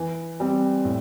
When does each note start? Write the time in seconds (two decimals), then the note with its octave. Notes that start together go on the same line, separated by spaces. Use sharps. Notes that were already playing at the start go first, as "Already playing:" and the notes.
Already playing: E3
0.40 G3 C4 G4
0.85 A2